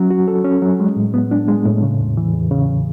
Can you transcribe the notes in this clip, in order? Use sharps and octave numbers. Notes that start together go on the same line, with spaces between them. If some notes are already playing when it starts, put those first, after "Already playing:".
Already playing: F#3 C#4
F#4
A4
C#4
F#3
G#3
A2
B3
D4
G#3
A2
C#3
E2
E3
E2
C#3